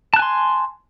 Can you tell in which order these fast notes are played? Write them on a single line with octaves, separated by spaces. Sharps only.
A5 F#6 G#5 C6